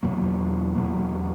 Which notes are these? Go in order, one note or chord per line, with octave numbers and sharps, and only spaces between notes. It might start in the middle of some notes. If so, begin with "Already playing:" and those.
E2 B2 F#3 A#3
E2 B2 F#3 A#3